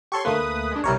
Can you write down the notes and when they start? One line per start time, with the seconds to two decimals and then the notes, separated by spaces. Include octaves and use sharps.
0.12 G4 A4 C#5 C6 C#6
0.25 D2 A3 A#3 B4 D#6
0.71 G#3 D4
0.84 B1 C3 G3 E4 A#4 C#5